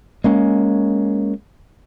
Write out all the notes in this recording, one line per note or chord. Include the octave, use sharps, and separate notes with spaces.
G#3 A#3 C#4